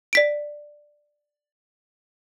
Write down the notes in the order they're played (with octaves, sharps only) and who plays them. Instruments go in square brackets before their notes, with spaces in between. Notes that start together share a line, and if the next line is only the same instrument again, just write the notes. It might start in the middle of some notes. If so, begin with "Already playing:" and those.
[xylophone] D5 B6 D7